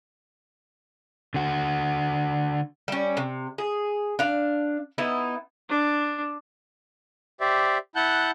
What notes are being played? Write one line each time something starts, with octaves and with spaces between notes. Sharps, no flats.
D3 F#4
G3 C#4
C3
G#4
D4 F5
B3 D#4 E4
D4
G4 C5 D5 E5
E4 F#5 A5 F#6 G6